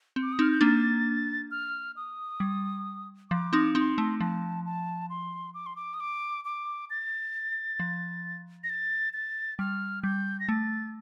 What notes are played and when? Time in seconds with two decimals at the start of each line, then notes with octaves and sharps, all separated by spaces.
0.16 C4
0.23 D6
0.33 D#6
0.39 C4 D#4
0.42 F6
0.51 G6
0.61 A#3 D4 A6
1.51 F6
1.96 D#6
2.40 G3
3.30 F3 D6
3.53 C4 D#4
3.75 C4 D#4 C6
3.98 A3
4.20 F3 A5
4.66 A5
5.10 C6
5.54 D6
5.66 C6
5.76 D6
5.94 D#6
6.00 D6
6.45 D6
6.90 A6
7.80 F3
8.64 A#6
8.70 A6
9.13 A6
9.59 G3 F6
10.03 G3 G6
10.40 A#6
10.48 A3 A6